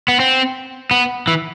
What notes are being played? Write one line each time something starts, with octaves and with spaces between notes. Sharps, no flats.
B3
C4
B3
E3